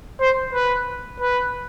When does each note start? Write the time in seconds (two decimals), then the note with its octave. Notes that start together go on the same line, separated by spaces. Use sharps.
0.20 C5
0.53 B4
1.20 B4